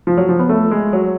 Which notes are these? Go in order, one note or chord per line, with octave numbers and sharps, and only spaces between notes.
F3
F#3
F3
B3
A3
G#3
F#3